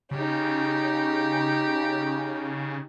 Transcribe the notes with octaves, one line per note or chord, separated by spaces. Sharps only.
C#3 D#4 G4